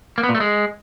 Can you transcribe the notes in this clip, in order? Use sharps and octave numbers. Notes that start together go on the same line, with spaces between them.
A#3
B3
A#2
A3
G#3